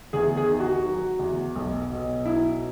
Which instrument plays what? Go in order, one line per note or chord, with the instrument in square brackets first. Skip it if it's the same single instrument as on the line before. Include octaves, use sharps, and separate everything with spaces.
[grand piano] E2 G#4
G#4
D#3
F#4
F#3
E2
B1
B2
F#3 E4